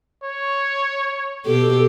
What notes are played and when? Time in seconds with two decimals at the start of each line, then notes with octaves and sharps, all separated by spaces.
0.24 C#5
1.46 B2 G4 A4